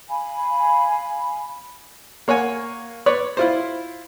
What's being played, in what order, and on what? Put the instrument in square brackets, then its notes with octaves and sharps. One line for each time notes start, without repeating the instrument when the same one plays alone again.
[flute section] F5 G#5 B5
[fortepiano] A#3 C#5 F#5 G#5
B4 C#5 D5
E4 F4 C5